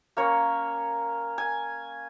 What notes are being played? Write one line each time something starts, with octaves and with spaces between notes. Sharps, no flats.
A#3 C#4 C#5
G#5